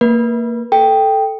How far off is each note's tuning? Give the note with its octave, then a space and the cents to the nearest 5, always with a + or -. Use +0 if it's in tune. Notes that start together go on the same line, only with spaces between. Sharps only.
A#3 -15 B4 -40
A4 -5 G5 +0